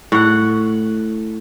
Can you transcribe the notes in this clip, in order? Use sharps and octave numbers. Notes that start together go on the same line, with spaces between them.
A2 F#5